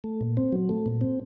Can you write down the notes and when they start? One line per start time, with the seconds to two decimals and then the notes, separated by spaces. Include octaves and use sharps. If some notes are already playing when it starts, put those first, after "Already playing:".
0.04 A3
0.21 A#2
0.37 C4
0.52 F#3
0.69 A3
0.86 A#2
1.01 C4